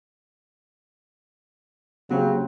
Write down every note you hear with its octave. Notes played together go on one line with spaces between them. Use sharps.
C#3 F#3 A#3 C4 C#4 G4